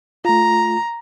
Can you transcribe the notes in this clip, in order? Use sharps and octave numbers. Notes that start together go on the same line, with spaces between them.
A3 F4 A#5